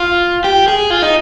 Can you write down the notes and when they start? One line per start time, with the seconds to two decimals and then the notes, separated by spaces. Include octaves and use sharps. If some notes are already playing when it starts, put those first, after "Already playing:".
Already playing: F4
0.44 G4
0.68 G#4
0.90 F4
1.02 D#4